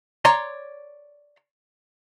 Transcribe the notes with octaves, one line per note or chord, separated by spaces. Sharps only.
C#5 D5 A#5 C6